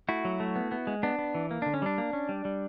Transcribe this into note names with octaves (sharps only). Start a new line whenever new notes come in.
A3 E4 F#4
F#3
A3
B3
B3
G#3
B3 D4
B3
E3
A#3
D3 D4
C#4
G3 D4
A#3
C#4
G3
G3